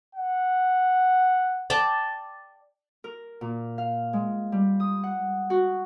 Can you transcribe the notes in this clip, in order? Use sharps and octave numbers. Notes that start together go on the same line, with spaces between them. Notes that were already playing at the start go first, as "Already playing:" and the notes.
F#5
D5 G5 A5
A#4
A#2
F5
G#3
G3
D#6
F#5
F#4